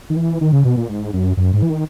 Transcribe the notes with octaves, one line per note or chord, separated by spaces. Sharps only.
D#3
E3
D#3
C#3
B2
A#2
G#2
F#2
F#2
G#2
E3
D#3